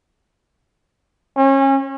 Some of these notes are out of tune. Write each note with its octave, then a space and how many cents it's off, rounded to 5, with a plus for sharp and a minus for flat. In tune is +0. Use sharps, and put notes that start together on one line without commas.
C#4 -30